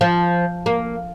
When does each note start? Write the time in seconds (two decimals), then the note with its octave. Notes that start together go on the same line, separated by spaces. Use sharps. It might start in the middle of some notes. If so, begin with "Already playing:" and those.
0.01 F3
0.66 A#3